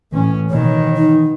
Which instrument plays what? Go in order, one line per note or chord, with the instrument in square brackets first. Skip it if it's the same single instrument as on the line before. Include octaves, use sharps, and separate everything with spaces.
[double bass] A2 C#4 [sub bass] E3
[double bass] B2 D#3 [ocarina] C#5
[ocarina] D#4